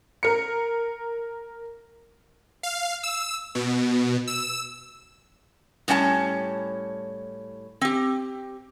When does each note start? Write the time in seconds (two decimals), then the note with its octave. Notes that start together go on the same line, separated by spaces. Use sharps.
0.23 A#4 C#7
2.63 F5
3.03 E6
3.55 B2
4.27 E6
5.88 A2 G3 C#4 F#5 A5
7.81 C4 G4